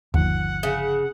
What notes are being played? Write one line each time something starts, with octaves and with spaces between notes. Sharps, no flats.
G1 D#2 F3 F#5
C#3